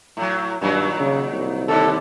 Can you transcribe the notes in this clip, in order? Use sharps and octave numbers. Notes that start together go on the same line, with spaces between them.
A2 F#3
G2 A#2 D#3 F#3
C#3
C2
D#2 D3 A4